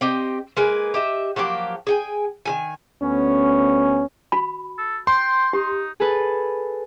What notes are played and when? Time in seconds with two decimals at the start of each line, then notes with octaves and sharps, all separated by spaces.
0.01 C4 G4 D#5
0.57 G#3 A#3 B4 G#5
0.94 G4 D#5 E5
1.36 F3 F#3 A#3 G4
1.87 G#4 G5 G#5
2.46 D#3 G3 G#5
3.01 D2 B3 C#4
4.32 F#4 B5
4.78 A4
5.07 G5 C6
5.53 D#4 G4
6.00 G#4 A4 B4